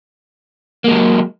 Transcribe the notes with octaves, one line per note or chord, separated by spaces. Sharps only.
F#3 G#3 A#3